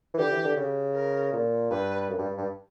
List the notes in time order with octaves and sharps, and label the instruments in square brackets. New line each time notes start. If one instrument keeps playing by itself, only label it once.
[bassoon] E3
[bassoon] D3 [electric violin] G4
[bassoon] E3
D3
C#3
[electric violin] A#4
[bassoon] A#2
[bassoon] G2 [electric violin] B4
[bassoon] F#2
G2
G2